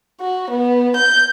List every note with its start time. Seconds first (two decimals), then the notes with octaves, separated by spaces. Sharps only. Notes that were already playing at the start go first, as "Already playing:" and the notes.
0.21 F#4
0.50 B3
0.96 G6